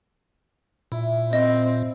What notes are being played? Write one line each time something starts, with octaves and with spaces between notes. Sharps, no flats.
A#2 E4
C4 D#5